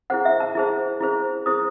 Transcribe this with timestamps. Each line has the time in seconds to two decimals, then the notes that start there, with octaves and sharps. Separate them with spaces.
0.10 E4 G#4 C5 F#5
0.25 E5
0.40 A5
0.55 E4 G#4 C5
1.00 E4 G#4 C5
1.46 E4 G#4 C5 D#6